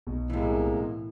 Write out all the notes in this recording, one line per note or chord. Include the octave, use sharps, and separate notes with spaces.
B1 B2
A2 C3 E3 G#3 A#3